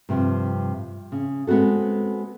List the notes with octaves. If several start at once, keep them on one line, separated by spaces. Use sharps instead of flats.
G2 C3 F3
C#3
G#3 B3 C4 F#4 A4